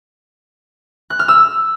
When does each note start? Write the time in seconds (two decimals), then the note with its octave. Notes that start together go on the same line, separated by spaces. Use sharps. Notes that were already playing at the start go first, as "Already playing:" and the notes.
1.10 F#6
1.19 F6
1.28 E6